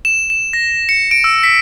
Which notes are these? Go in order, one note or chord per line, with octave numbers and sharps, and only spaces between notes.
E7
E7
A#6
C#7
D7
E6
B6